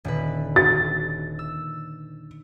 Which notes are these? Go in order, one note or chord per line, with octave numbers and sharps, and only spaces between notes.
D#1 D3 B4
A6
E6